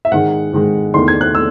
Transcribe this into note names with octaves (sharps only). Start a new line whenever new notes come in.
E5
G#2 D#3 G#3 F#5
G#2 D#3 G#3
E2 D#3 A3 C6
G#6
F#6
A3 E6